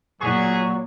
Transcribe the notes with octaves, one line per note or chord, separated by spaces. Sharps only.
A#2 F#3 B3 F#4 G#4 C#6